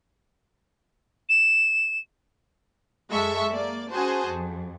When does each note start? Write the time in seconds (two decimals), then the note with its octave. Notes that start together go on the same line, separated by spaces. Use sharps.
1.29 E7
3.11 F#2 G#3 A4 E5 C#6
3.52 A#3 D5
3.92 C#4 F#4 G#4 C5 A5
4.27 F2